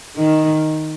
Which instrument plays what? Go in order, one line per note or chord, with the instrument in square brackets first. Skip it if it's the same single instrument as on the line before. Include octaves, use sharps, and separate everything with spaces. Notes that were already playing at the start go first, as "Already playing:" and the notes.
[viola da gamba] D#3